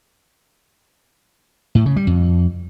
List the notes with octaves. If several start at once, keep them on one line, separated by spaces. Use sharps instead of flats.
A2
C#3
G3
F2